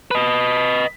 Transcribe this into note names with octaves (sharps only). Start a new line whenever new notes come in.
B4 D#5